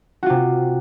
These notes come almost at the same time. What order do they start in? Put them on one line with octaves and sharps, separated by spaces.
F#4 F4 C3